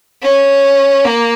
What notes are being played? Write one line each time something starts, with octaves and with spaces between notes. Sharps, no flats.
C#4
A#3